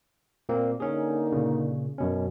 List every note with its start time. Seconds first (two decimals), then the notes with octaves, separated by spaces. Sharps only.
0.49 A#2 A#3 C4
0.80 D3 A#3 C#4 D#4 G#4
1.32 A#2 C#3
1.98 F#2 B2 C#4